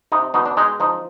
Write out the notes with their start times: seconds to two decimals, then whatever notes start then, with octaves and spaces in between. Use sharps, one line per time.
0.12 C3 D#4
0.34 B2 D#4
0.46 D4
0.57 G#3 D#4
0.80 F3 D#4